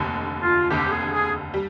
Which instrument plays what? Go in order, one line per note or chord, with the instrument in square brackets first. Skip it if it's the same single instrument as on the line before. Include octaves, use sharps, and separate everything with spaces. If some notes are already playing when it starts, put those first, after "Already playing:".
Already playing: [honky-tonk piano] F1 D#2 D3
[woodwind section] F4
[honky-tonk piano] F1 D#2 D3 [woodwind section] G4
[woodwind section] G#4
G#4
[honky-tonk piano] G3